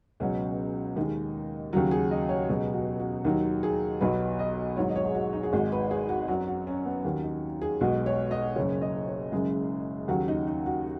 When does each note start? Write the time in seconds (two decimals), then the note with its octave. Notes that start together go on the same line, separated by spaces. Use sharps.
0.20 C#2 B2 F#3 C#4
0.96 D#2 D#3 G#3 D#4
1.73 D#2 C#3 F#3 F#4
1.91 G#4
2.11 D#5
2.29 C#5
2.49 C#2 B2 F#3 G#4
2.73 F#4
3.00 F#4
3.25 D#2 D#3 F#3 D#4
3.63 G#4
4.01 B1 B2 F#3 B4
4.39 D#5
4.77 G#1 G#2 F#3 C#5
4.89 D#5
4.96 C#5
5.05 G#4
5.15 F#4
5.33 D#4
5.43 G#4
5.52 G#1 G#2 G#3 F#4
5.72 B4
5.91 G#4
6.09 F#4
6.28 F#2 F#3 F#4
6.48 F#4
6.67 C#4
6.86 B3
7.05 D#2 D#3 F#3 C#4
7.24 D#4
7.62 G#4
7.80 B1 B2 G#3 F#4
8.06 C#5
8.31 D#5
8.56 F#1 F#2 C#3 C#5
8.82 D#5
9.07 C#5
9.32 F#1 F#2 C#3 G#3 G#4
10.08 D#2 C#3 F#3 F#4
10.28 D#4
10.47 D#4
10.66 F#4